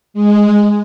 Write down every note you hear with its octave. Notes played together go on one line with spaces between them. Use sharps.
G#3